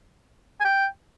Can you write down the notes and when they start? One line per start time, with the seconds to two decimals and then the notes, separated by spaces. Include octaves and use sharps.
0.60 G#5
0.65 G5